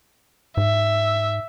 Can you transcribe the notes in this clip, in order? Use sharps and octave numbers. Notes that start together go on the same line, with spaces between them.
G#2 E5